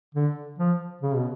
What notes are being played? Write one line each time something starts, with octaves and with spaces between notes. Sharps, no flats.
D3
F3
C#3
B2